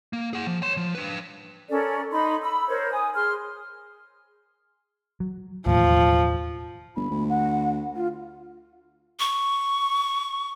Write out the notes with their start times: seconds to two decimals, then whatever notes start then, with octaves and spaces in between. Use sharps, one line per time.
0.13 A#3
0.33 G#4 F#5
0.47 F3
0.62 C#5 C6
0.77 F3
0.95 D4 B4
1.70 C#4 A4 A#4 D5
2.11 D#4 B5 C6
2.43 B5 E6
2.68 A#4 C5 C#5
2.91 G#5 D#6
3.15 G#4 C6 F6
5.20 F#3
5.66 E1 D#2 A2 F3
6.96 G1 B5
7.10 D2
7.29 F#5
7.96 F4
9.19 C#6